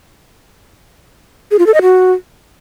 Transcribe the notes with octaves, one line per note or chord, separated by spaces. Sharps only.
G#4
F4
A4
D#5
F#4